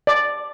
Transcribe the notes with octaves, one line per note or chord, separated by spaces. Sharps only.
D5